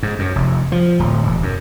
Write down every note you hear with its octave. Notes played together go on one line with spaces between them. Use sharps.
G#2
F#2
F1
F3
D1
E1
F#2